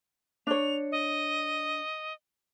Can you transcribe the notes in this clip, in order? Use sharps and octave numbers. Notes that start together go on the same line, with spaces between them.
D4 C#5 F7
D#5